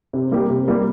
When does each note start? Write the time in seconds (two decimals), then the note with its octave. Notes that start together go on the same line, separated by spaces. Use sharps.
0.13 C3
0.31 G3 A#3 G4
0.50 C3
0.68 G3 A#3 G4